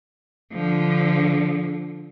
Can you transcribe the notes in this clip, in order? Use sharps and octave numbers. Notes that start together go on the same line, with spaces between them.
D3 F3